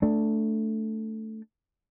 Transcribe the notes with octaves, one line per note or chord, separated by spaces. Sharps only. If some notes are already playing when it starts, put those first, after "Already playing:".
A3 D4